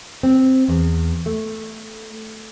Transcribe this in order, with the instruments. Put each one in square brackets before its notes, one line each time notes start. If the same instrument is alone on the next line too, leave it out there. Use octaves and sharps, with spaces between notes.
[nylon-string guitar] C4
E2
A3